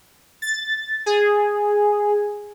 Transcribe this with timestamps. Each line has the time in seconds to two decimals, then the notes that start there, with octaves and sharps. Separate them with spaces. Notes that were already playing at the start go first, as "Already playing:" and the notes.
0.42 A6
1.06 G#4